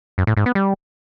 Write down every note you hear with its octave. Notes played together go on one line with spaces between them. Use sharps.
F#2
A2
G#2
B3
G3